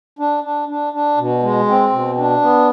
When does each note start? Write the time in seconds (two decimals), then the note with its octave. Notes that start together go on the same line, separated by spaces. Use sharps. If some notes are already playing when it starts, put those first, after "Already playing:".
0.19 D4
0.44 D4
0.69 D4
0.93 D4
1.17 B2
1.42 G#3
1.68 C4
1.91 B2
2.17 D4
2.42 B3